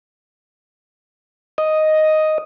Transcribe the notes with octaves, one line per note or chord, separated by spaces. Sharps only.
D#5